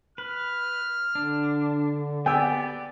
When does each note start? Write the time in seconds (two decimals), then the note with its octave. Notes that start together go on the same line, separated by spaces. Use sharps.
0.18 B4 F6
1.15 D3 D4
2.26 B3 G4 D5 G5 G#5 E6